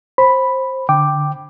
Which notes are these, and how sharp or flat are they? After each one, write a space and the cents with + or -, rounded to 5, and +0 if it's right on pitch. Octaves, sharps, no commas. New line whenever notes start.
C5 +15 B5 +0
D3 +0 G5 +0 D6 +5